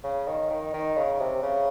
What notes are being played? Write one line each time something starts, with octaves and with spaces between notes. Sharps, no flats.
C#3
D#3
D#3
D#3
C#3
C3
C#3